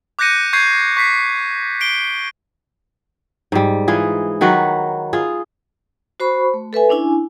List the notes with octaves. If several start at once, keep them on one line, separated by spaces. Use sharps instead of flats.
D6 F#6 G6 A#6 C#7 D#7
C#6 G6 G#6 C7 D#7
C#6 B6 C7
C7 D7 G7
G#2 G3
E3 F4 G#4
D#3 F#3 F#4 B4
F4 G#4
F#4 C5 B5 C#6
A3
A4 B4 E5 G#5
C#4 D4 E4 G#5